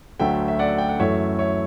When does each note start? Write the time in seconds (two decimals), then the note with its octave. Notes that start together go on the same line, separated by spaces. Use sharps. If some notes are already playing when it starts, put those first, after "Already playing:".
0.20 D2 D3 F#3 A3 E5 G5
0.48 E5
0.59 D5 F#5
0.78 G5
0.89 F#5
0.99 F#2 E3 A3 C#5 E5
1.39 C#5 E5